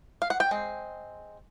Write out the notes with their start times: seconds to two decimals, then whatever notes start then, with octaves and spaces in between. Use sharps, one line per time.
0.22 F5
0.30 F#5
0.40 G5
0.51 G#3 C4